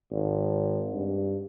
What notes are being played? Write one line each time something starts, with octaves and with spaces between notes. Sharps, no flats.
G#1
G2